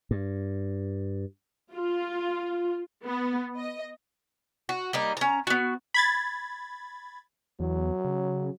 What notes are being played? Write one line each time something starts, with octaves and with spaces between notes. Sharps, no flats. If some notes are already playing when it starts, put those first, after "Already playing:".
G2
F4
B3
D#5
F#4
G3 A#3 D#4
C#4 A#5
B3 F#4
B5 G#6 A6
E2 F#3
C#3